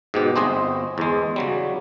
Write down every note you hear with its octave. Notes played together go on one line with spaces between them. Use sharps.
G#2 B2 G4
G1 C4 C5 D#5 G#5
E2 G#3
C#3 F#3 G3